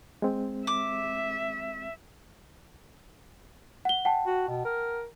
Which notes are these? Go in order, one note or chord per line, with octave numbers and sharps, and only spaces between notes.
G#3 C4
E5 D6
F#5 G7
F#5 G5 A5
F#4
B2
A#4